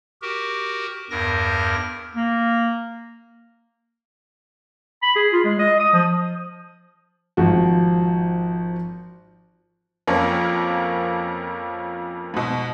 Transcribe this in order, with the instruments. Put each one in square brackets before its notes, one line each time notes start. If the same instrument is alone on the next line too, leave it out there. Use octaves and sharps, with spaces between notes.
[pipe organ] F#4 G4 A#4
E2 G2 A#4 A#6
[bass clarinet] A#3
[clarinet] B5
G#4
F4
G#3
D#5
D#6
F3
[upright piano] G#1 F3 F#4
[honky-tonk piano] F2 F3 A#3 C#4
G#2 B2